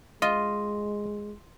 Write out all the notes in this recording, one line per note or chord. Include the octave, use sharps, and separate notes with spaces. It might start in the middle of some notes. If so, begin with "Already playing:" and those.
G#3 F4 D#5